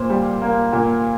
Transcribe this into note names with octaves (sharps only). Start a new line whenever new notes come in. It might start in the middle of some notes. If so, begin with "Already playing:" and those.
Already playing: A#2 C5
G3
A#3
A#2